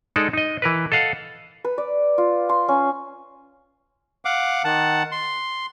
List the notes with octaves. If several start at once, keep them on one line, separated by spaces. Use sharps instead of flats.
G#3 D#4 A4 D5
D#4 D#5
E3 A#4 B4
A4 D#5 F5 F#5
B4
D5
F4
C6
C#4
F5 F#5 D6
D#3 F#5 A5
C6